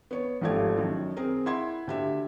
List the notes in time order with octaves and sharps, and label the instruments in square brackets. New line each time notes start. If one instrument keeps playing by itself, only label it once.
[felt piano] B3 C#5
G#1 D#2 F3 A3 G4 G#6
F#2 D#3
C4 G#4 A#4
E4 E5 F#5 C6 G#6
D2 G4 E5